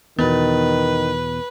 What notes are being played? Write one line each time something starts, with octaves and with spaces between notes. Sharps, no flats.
E2 B2 D#3 B3 B4